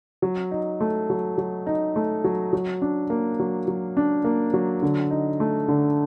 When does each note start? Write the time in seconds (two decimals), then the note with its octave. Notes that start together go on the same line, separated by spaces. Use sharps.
0.22 F#3
0.51 D#4
0.81 A3
1.10 F#3
1.38 F#3
1.67 D#4
1.96 A3
2.24 F#3
2.53 F#3
2.82 D4
3.10 A#3
3.39 F#3
3.68 F#3
3.97 D4
4.24 A#3
4.53 F#3
4.82 D3
5.10 D#4
5.40 A3
5.68 D3